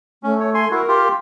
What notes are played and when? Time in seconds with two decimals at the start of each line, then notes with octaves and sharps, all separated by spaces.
0.23 A3 C#4
0.40 C#5
0.54 G#5 C6
0.71 E4 F#4 A#4
0.88 F4 G4